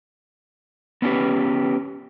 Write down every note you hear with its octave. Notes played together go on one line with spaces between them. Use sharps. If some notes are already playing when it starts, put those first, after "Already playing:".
B3 C#4 D4 F4 G4 B4